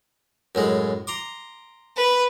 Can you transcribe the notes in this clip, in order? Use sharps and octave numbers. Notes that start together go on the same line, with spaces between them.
F#2 A2 G#3
A#5 C6 D6
B4